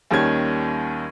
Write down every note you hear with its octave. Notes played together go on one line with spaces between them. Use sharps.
D#2 D#3 G3 C#4 G#6